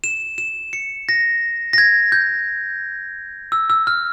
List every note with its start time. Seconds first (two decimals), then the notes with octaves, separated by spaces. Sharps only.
0.04 E7
0.38 E7
0.73 C#7
1.09 A#6
1.73 A#6
1.78 G#6
2.12 G6
3.52 E6
3.70 E6
3.87 F6